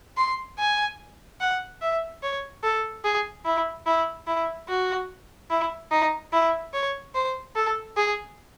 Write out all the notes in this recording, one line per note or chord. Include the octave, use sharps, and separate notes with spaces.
C6
G#5
F#5
E5
C#5
A4
G#4
E4
E4
E4
F#4
E4
D#4
E4
C#5
C5
A4
G#4